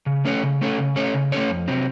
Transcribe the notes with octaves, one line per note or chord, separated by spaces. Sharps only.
C#3
A3 C#4 A4 C#5
C#3
A3 C#4 A4 C#5
C#3
A3 C#4 A4 C#5
C#3
A3 C#4 A4 C#5
F2
C3 F#3 C4